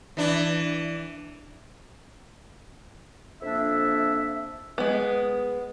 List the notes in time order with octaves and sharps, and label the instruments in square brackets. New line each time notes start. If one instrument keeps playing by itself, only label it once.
[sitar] E3 D4
[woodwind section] F2 A#3 D4 E5
[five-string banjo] G#3 B3